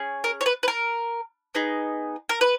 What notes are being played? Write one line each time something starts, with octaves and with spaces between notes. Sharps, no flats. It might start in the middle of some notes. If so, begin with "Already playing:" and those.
Already playing: C#4 G#4
A#4
C#5
B4
B4
A#4
B3 D#4 G#4
A#4
B4